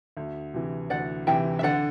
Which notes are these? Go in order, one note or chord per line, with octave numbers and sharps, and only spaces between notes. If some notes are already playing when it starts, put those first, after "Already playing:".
D2
C3 E3
D2 D5 F#5
C3 E3 E5 G5
E5
D3 D5 F#5